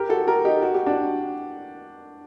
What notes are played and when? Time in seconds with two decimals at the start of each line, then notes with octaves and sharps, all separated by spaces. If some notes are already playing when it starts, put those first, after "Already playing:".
Already playing: G4 A#4
0.09 F#4 A4
0.27 G4 A#4
0.45 D#4 G4
0.62 F#4
0.74 G4
0.86 D4 F#4